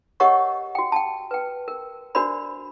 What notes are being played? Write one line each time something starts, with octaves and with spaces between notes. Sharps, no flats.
G4 A#4 C#5 D#5 F#5 C#6
F#4 G5
G5 A5
B4 G5
A#4
D4 F#4 A#4 C5 D5 B5